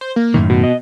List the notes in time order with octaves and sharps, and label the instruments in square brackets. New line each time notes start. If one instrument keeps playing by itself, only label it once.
[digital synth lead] C5
A#3
[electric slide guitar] F#2 A2 D#3
[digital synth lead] B2
[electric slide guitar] D#5